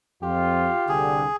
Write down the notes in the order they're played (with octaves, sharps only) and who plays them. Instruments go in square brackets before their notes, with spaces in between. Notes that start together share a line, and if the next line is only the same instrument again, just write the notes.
[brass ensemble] F2 [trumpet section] F4 [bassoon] G4
[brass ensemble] C2 D3 [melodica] G#4